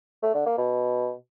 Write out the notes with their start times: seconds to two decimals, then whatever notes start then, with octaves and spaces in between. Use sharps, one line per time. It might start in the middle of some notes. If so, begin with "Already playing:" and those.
0.23 A3
0.35 D3
0.46 A#3
0.58 B2